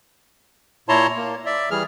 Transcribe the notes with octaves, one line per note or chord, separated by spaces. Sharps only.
A#2 E4 C#5 A5 A#5 C6
A#3
D5 E5
E3 G3 G#4 F6